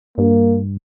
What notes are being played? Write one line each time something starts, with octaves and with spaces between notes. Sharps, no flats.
G2 A#3